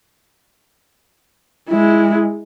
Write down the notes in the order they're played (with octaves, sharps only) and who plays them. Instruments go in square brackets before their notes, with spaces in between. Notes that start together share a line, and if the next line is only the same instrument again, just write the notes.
[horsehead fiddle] G#3 E4